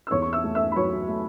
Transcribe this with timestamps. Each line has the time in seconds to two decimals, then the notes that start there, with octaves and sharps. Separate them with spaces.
0.07 E6
0.11 E2 C#5 C#6
0.22 C#6
0.32 E5 E6
0.44 A3
0.55 E5 E6
0.72 B5
0.76 F#3 C#5 C#6
1.08 A3